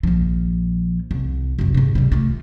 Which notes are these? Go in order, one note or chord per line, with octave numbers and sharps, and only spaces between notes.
A#1 F3
C2
C2 F#2
G#2 C3
C3 G3
A3 F4